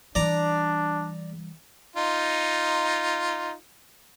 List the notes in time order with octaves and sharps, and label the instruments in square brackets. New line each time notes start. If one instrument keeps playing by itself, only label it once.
[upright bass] E3 G3 [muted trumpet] D4 [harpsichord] D5 A#5
[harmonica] D#4 F4